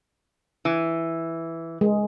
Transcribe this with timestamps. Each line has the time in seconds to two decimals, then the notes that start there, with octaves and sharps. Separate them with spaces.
0.65 E3
1.81 G#3